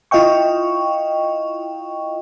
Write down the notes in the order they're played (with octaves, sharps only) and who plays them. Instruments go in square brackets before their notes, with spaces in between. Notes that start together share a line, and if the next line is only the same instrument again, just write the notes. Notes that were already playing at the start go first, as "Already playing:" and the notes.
[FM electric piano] E4 F4 D#5 F5 G5 C#6